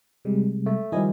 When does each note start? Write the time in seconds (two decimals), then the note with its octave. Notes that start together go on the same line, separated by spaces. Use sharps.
0.25 C3 G3 G#3
0.66 A3
0.92 D#3 F3 G3 E4 D#5 G#5